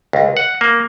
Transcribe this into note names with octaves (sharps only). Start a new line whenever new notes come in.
C#2
F#5
A#3